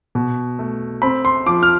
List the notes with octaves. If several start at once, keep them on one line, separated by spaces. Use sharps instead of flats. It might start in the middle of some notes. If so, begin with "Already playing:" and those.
B2
A3
C4 B5
C6
F3 D6
F6